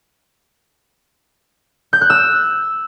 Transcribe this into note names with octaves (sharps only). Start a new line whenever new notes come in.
G6
F#6
E6